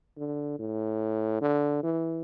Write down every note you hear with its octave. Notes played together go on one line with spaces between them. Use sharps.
D3
A2
D3
E3